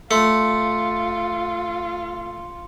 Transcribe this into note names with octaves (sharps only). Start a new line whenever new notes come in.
A3 F4 C6 C#7